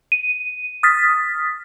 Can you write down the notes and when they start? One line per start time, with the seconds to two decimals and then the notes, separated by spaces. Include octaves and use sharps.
0.12 D#7
0.83 D#6 F6 A6 B6